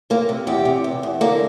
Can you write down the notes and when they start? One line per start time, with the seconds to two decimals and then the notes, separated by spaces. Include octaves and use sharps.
0.10 C3 A#3
0.29 C3
0.47 E2 G4
0.65 C3
0.84 E2
1.03 E2
1.21 D3 A#3